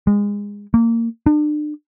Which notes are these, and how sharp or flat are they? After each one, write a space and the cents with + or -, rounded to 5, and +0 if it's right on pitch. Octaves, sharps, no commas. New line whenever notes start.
G#3 -25
A#3 -20
D4 +40